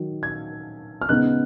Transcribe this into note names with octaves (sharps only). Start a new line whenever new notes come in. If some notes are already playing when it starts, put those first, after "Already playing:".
Already playing: D#3 F#3
G#6
F6
C#3 G#3 B3 D#4 F#6